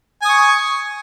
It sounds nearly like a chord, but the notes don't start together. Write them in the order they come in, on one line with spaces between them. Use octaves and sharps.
G#5 D#6 C#6